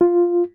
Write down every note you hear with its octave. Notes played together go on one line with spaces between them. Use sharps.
F4